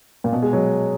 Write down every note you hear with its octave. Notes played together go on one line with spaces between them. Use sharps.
A#2
B2
G#3
F#3